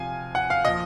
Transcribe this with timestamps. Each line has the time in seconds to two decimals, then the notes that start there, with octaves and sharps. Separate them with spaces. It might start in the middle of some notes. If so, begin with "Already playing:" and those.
Already playing: C3 F3 F5 G#5
0.35 F#5
0.50 F5
0.65 A#2 F3 D#5